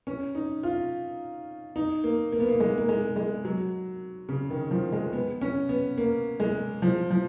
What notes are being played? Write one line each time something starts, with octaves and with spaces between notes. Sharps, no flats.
C#4
D#4
F4
D#4
A#3
A#3
B3
A#3
G#3
A#3
G#3
G#3
F#3
C#3
D#3
F3
G#3
B3
C#4
B3
A#3
G#3
F3
F3